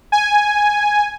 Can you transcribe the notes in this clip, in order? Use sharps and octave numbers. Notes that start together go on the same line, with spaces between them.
G#5